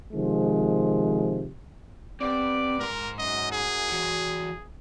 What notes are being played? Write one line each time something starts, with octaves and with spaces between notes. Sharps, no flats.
C3 D#3 F3 G#3
G3 B3 C4 D5
G#2 A#4 C6
F#2 D#5
G#4
E3 F#4